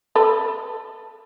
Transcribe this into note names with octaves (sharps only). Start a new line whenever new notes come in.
A4 B4